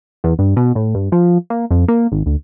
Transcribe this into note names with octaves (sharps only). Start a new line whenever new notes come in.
E2
G2
B2
A2
G2
F3
A#3
F2
A#3
G#1
D2